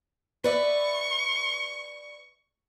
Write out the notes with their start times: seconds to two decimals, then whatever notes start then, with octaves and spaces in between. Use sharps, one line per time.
0.44 B4 D5 E5 C#6